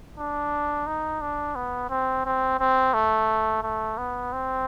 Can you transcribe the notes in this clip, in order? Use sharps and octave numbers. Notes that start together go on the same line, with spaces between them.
D4
D#4
D4
B3
C4
C4
C4
A3
A3
B3
C4